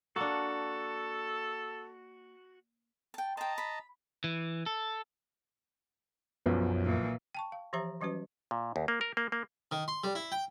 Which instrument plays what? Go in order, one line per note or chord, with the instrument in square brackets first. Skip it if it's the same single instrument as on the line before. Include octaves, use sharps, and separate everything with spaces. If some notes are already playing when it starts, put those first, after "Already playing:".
[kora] A#3 D4 [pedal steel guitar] F#4 [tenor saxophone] A4
[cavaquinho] G5 A5
[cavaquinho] C5 G5 [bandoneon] D#5 A5 A#5
[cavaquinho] B5
[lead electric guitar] E3
A4
[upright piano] B1 F3 [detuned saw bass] F#2 [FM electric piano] B3
[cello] A#2 E3
[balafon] G5 A5 C#6
F5
E3 F3 G4 C5 E5 A#5
E3 F#3 G3 C#4 F#4 B4
[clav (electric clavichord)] A#2
D#2
A#3
A#4
A#3
A#3
[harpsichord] D#3
C6
G3
E4
G5